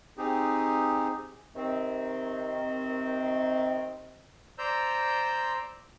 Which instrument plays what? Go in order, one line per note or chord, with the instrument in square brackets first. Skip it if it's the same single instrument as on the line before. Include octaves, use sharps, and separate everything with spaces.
[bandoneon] C4 D#4 G4 G#4
[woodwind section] C3 D#3 C4
[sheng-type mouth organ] C5 D5 A#5 E6 G6